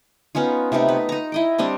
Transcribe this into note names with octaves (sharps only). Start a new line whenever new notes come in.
B3 C#4 D#4 F4
C3 A3 B3 D#4
B4
D#4 A#5
E4 D#5 G5
G3 C4 D4 D#5